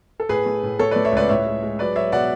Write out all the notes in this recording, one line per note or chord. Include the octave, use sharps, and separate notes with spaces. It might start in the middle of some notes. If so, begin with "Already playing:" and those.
A4
A2 G#4 B4
A3
A2
A3 A4 C#5
B4 D5
A3
C#5 E5
C#2 B4 D5
A2 C#5 E5
G#3
G#3
F#3 B4 D5
F#3 C#5 E5
B2 D5 F#5